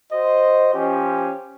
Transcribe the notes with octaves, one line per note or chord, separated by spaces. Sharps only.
F#4 C5 D#5
F3 C#4 G4